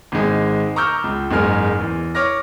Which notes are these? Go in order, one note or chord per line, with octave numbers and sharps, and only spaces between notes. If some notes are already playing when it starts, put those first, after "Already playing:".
G#1 D#3 G#3 G#5
A#5 C#6 D6 E6 F6 G6
C#2
F#1 G#2 G#3 A#4 G#5 F6
E2
C#5 D6 F6 A#6